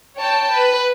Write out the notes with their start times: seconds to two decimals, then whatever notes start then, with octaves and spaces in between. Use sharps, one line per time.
0.18 C#5 G5 A5
0.54 B4